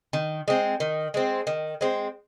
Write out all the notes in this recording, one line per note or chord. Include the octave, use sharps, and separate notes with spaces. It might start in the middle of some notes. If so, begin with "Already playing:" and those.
D#3
G#3 C4
D#3
G#3 C4
D#3
G#3 C4